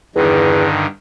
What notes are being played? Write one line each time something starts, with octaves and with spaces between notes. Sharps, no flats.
E2 G2 D3 D#3